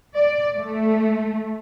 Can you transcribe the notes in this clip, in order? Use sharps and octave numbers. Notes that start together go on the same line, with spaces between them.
D5
A3